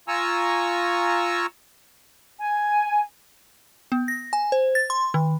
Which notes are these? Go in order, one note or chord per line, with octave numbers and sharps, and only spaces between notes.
F4 G#5 A#5 C#6 E6
G#5
B3
A#6
G#5
C5
A6
C6
D#3